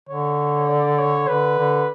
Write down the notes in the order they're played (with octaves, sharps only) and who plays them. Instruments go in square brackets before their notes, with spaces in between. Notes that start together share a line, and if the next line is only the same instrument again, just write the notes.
[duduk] D3 [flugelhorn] C#5
[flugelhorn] D5
C#5
[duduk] D3 [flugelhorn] B4
[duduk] D3